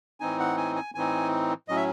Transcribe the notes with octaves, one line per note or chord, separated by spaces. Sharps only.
A2 E3 C4 D#4 G#5
F#5
G#5
G#5
A2 E3 C4 D#4 G#5
A2 F#3 C#4 D#5
E5